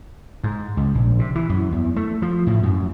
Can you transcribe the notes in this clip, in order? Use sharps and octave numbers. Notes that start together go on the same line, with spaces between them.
G#2
C#2
A#1
C3
E3
F#2
E2
A3
F3
A2
F#2